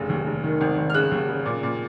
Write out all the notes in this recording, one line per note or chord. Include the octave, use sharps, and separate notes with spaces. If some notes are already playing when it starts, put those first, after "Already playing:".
Already playing: F1 C#3
D#2
F1
D#3
G#1
G#1
F6
C#3 F#6
D#2
C#3
A#2
A#2